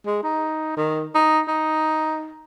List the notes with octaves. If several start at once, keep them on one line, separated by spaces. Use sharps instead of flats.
G#3
D#4
D#3
D#4
D#4